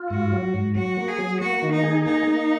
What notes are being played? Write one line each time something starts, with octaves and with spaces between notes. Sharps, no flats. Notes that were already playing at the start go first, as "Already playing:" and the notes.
Already playing: F4
G#2 F#4
F#3
G#2
F#3 F#4
A#3
G#4
F#3
A#3 F#4
D#3
D#4
G#4
A#3 D#4
A#3